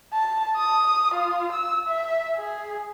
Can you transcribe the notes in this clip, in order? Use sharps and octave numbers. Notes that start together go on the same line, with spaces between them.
A5
D#6
F4
E6
E5
G#4